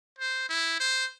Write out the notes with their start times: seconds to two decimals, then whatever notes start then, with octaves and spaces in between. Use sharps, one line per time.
0.19 C5
0.49 E4
0.80 C5